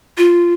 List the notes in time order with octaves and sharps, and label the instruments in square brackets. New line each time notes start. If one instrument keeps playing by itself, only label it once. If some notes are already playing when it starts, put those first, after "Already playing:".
[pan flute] F4